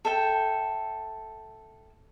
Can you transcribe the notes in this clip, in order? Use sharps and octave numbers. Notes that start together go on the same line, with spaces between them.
A4 E5 G5